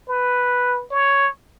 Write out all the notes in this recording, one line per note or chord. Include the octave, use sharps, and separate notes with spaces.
B4
C#5